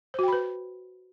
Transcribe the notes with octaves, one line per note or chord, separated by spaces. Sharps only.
F#4 B4 C5 G5 B5